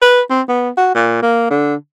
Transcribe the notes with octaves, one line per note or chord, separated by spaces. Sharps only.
B4
C4
B3
F#4
A#2
A#3
D3